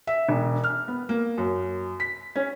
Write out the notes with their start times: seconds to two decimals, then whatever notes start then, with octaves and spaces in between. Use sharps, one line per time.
0.07 E5
0.29 E1
0.64 F6
0.88 B3
1.09 A#3
1.38 F#2
2.00 B6
2.35 C#4